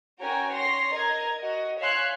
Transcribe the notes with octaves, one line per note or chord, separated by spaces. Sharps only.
C#4 F#4 A#4 G5 G#5
C#5 C6 A#6
A#4 D#5 G#6
F#4 D#5
C#5 E5 F5 G#5 C6 F#6